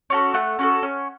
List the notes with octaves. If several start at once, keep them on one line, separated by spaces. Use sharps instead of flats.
C#4 F#4 A4
A3 F#5
C#4 F#4 A4
C#4